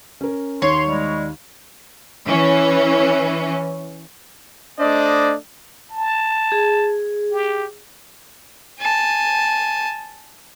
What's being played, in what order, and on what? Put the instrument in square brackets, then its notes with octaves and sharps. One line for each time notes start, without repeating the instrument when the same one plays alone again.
[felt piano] C#4 A#4
[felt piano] D#2 [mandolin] C#5 [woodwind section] C6
[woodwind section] G3 G#3
[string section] E3 C#4
[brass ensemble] A3 D4 C5 D5 D#5
[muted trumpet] A5
[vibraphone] G#4
[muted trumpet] G4
[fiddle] G#5 A5